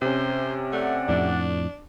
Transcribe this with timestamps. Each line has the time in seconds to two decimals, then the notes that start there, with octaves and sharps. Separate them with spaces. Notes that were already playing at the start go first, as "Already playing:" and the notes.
0.02 C3 C#4 C5
0.73 A3 D5 F#5
1.09 F2 A2 D4